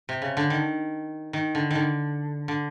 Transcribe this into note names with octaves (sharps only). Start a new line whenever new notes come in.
C3
C#3
D3
D#3
D#3
D3
D3 D#3
D3